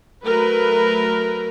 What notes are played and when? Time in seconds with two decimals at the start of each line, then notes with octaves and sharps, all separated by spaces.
0.24 F#3 A3 A#4 B4